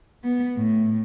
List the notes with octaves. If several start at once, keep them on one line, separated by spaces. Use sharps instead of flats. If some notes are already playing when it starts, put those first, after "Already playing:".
B3
A2